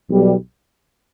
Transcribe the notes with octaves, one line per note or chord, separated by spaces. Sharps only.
B1 B2 G3